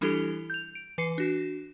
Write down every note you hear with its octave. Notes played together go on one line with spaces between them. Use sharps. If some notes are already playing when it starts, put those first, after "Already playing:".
E3 G3 D4 E4 G4 A4
G6 F7
D7
E3 B4 C7 C#7
D4 F#4